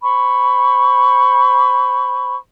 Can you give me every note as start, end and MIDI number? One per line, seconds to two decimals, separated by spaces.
0.03 2.36 72
0.03 2.36 83
0.03 2.36 85